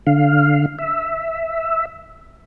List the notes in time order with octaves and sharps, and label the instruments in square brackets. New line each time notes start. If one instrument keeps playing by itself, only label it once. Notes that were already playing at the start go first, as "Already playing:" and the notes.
[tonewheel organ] D3 F5
E5